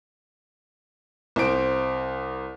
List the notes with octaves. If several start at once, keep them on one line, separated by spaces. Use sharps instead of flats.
C2 C5 D7